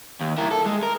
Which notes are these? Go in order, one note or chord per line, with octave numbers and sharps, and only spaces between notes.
D#2
E4 A#4
A4
G#3
A#4